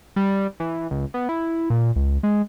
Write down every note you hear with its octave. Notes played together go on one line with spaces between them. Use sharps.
G3
E3
C#2
B3
E4
A#2
C#2
G#3